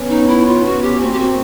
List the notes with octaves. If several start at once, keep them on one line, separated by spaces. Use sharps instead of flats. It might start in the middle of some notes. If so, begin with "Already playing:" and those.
Already playing: B3 C#4
D#4
E4
F4
F#4
G4
A#3 C4 F#4
G4
F#4